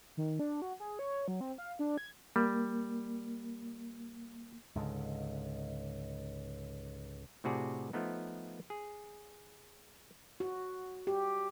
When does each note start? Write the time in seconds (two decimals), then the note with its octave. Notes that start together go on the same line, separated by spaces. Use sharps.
0.17 D#3
0.39 D4
0.62 F#4
0.80 G#4
0.99 C#5
1.28 F#3
1.41 C4
1.58 F5
1.79 D4
1.98 G#6
2.36 G3 A#3
4.75 C#2 G#2 D3
7.44 A2 C3 F#4 G#4 D5
7.93 F3 A3 B3 D#4
8.70 G#4
10.40 F#4
11.07 G4